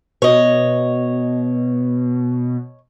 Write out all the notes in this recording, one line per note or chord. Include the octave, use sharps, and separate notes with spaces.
B2 C#5 D#5